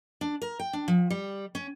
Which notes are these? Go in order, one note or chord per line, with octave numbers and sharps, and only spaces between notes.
D4
A#4
G5
D4
F3
G3
C#4